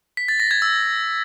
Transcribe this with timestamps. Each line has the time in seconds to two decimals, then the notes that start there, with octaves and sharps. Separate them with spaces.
0.17 B6
0.28 A6
0.40 A#6
0.51 G#6
0.62 E6